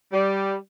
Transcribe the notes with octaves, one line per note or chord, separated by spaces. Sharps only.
G3